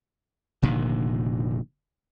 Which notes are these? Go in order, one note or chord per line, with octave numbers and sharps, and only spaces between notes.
F1 A#2 D3 D#3